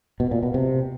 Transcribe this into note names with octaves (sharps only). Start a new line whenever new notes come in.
B2
A#2
B2
C3